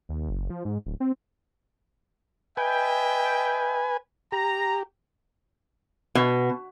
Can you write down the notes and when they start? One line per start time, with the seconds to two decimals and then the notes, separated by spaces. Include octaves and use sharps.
0.09 D#2
0.29 F#1
0.50 F3
0.65 G#2
0.86 D1
1.00 C4
2.57 B4 D#5 E5 G5 G#5
4.32 G4 A#5
6.15 B2